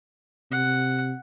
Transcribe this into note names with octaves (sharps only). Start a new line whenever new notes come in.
C3 F#5